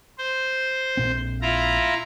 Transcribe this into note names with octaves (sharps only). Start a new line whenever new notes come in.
C5
A#1 A#2 C4
E4 F4 A#5